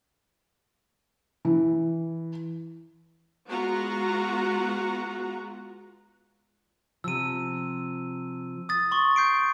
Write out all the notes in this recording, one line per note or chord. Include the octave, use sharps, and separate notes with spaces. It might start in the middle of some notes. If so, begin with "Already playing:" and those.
E3
G#3 B3 F4 F#4 F#5 A#5
C3 F3 E6 D#7
D#6 A6
C6 C#6
G6 C7 D7